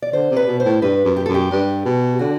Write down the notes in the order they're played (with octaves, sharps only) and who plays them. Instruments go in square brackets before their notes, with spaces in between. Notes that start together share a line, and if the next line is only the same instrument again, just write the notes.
[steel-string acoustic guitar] D5
[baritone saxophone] D3 [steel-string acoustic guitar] C5
[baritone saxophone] C3
[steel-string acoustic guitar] B4
[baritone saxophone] B2
[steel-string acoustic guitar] C5
[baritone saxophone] A2
[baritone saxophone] G2 [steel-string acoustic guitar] B4
[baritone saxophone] F#2
[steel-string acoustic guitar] G4
[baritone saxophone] F#2 [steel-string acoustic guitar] A4
[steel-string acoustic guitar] G4
[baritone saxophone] G2
B2
[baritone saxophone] D3 [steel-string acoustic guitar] F#4